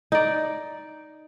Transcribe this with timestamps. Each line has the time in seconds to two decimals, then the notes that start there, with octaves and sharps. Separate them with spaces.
0.12 D#4 D5